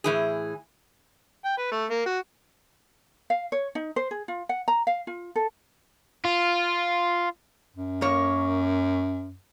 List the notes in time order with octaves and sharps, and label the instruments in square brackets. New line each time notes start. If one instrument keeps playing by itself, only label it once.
[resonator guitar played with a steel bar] A2 E3 G#4
[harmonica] G5
B4
A3
A#3
F#4
[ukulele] F5
C#5
D#4
C5
G#4
F4
F#5
A#5
F5
F4
A4
[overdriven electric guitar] F4
[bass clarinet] F#2
[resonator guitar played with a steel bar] A#3 A#4 C#5